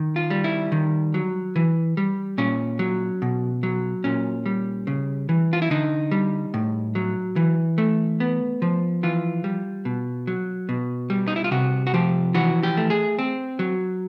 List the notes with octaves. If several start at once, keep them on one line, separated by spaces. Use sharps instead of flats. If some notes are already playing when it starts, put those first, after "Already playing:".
Already playing: D#3
F4
G3
E4
D#3
F#3
E3
G3
A#2 C#4
F#3
B2
F#3
A#2 C#4
G3
C#3
E3
F4
E4
D3 D#4
G3
A2
F#3
E3
A3
B3
F3
E3 F4
G3
B2
F#3
B2
G3
D#4
E4
F4
C3 F#4
F#4
F3 G4
E3 F#4
G4
A3
G#4
C4
F#3